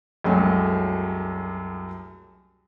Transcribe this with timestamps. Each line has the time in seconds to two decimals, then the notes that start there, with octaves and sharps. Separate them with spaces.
0.24 C2 F#2 F#3 G#3 A3